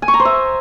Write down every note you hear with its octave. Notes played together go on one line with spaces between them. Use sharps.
G#5
C#6
A#5
C5
E5